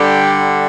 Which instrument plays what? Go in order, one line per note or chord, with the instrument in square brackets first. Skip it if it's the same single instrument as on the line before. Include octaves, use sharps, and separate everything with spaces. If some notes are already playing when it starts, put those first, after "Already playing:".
Already playing: [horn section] D3 G3 G4